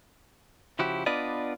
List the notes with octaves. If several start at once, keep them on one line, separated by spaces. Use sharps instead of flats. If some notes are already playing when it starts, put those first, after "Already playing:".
C#3 F3 E4 F#4 G4
B3 D4 F4 B4 D5 D#5